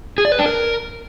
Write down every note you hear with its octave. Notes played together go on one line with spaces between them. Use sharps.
G#4
D5
B4
D4
A#4